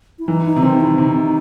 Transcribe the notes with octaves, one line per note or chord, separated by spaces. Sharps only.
E4
E3 D#4
D#4
C3
D#3 C4
E4
C3 D#4